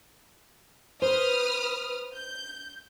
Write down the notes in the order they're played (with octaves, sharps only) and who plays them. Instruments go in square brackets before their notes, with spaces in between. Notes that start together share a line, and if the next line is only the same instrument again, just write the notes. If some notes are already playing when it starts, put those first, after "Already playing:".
[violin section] B4 D#6 F6 [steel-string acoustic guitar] C5
[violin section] G6